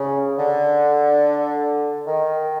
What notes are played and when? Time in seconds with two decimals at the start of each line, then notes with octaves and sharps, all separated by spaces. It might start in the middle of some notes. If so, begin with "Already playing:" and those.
Already playing: C#3
0.38 D3
2.06 D#3